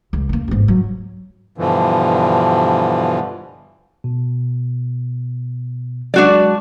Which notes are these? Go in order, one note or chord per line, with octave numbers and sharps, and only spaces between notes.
C#2
A#3 C4
G1 G#2
F#3
G2 B2 D3 E3 F3
B2
F#3 G#3 D4 F#4 D5